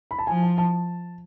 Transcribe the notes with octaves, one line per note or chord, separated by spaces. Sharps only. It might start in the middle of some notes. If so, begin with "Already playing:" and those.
B5
A5
F3 G#5
A5
A5